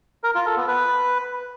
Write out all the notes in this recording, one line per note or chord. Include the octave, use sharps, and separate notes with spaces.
A#4
F4
A4
B3
B4